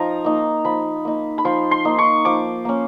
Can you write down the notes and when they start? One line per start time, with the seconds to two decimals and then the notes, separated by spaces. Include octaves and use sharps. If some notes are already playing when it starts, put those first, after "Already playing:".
Already playing: F3 D#4 A#5
0.24 A#3 D#4
0.65 F3 B5
1.05 A#3 D#4
1.38 B5
1.45 F3 C6
1.71 C6
1.85 A#3 D#4
1.98 C#6
2.25 F3 D6
2.65 A#3 C#4